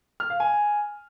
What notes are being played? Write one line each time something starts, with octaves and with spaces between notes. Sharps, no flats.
F6
F5
G#5